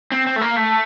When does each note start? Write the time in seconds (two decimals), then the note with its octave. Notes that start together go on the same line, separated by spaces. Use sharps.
0.11 C4
0.26 C4
0.36 A3
0.41 A#3
0.56 A3